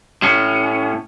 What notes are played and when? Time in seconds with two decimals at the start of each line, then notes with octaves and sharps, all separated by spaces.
0.22 A2 C#4